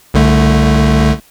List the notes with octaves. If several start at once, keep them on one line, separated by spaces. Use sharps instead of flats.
C2 D3 A3